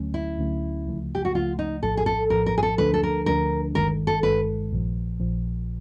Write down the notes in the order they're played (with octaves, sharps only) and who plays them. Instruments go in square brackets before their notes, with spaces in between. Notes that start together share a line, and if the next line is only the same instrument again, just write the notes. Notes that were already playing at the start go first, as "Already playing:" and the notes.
Already playing: [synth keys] D2 D3 F#3 A3 C#4
[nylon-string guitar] E4
[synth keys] D2 D3 F#3 A3 C#4
C#2 C#3 F3 A3
[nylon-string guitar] G4
F#4
[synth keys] C#2 C#3 F3 A3 [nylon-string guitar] F4
[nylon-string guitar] D#4
[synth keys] A#1 A2 F3 [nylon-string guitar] A4
[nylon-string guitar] G#4
A4
[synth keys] A#1 A2 F3 [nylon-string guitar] A#4
[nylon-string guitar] A#4
G#4
A4
[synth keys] D2 D3 F3 A3 D4 [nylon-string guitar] B4
[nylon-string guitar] A4
A#4
[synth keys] D2 D3 F3 A3 D4 [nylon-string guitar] A#4
[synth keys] G1 G2 D#3 G#3 [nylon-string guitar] A#4
[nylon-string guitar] A4
[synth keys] G1 G2 D#3 G#3 [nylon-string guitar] B4
[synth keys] A#1 A#2 F3
A#1 A#2 F3